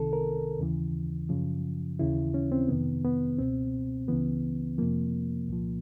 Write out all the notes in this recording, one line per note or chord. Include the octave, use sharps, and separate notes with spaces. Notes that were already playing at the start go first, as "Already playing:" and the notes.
Already playing: C2 C3 D#3 A4
A#4
D#2 C#3 E3
F#2 C#3 F3
D#2 C#3 E3 E4
C#4
C4
F2 C3 D#3 B3
B3
C#2 B2 C4
C#2 C#3 E3 B3
F2 C3 F3 A#3
C2 A#2 F3